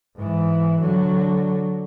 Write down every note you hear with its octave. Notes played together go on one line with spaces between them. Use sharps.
G#2 E3
D3 F#3